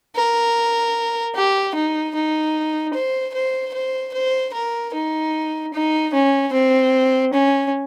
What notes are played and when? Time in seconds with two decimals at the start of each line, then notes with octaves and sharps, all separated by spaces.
0.16 A#4
1.36 G4
1.75 D#4
2.15 D#4
2.94 C5
3.35 C5
3.74 C5
4.14 C5
4.54 A#4
4.94 D#4
5.74 D#4
6.14 C#4
6.53 C4
7.33 C#4